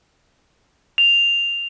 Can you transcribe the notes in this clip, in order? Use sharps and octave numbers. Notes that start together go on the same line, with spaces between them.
F7